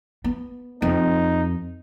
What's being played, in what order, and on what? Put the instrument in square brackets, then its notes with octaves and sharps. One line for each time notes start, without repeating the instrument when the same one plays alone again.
[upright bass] B3
[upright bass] F2 [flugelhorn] D#4